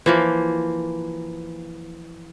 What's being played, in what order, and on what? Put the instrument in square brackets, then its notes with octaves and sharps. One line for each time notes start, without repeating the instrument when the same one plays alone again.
[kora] E3 F3 A#3